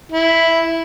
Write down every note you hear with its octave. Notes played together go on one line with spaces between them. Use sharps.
E4